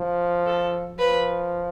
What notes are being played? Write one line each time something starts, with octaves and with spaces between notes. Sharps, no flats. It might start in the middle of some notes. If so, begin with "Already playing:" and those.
Already playing: F3
A4
F3 B4